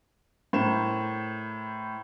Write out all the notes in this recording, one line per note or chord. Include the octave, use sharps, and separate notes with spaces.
A2 A#4 C5 E7